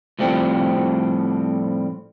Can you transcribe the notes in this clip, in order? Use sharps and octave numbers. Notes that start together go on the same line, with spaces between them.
A2 F3 G3 C4